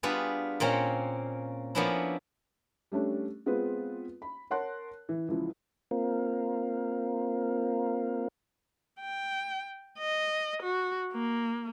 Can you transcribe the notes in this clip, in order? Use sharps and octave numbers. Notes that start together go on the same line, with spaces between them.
G3 B3 D4 F4 G#4 B4
A#2 A#3 C4 C#4
F3 A#3 B3 C#4 D4 E4
G3 A3 C#4 D4
G#3 B3 C4 F4 B4
B5
A#4 C#5 F#5 A5 C6 F#6
E3
C#2 E3 F3
A#3 C4 F4 A#4
G5
D#5
F#4
A#3